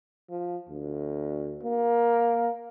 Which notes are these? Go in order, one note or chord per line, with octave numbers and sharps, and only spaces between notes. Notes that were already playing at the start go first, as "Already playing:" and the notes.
F3
D2
A#3